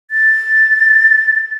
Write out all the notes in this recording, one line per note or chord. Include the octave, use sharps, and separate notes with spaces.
A6